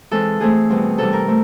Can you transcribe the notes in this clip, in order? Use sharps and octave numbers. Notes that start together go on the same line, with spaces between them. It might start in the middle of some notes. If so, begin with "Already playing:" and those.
E3 G#3 C4 A4
E3 A3 C4 G#4
B2 G3 C4
C3 E3 G3 A4
A#4
A3 C4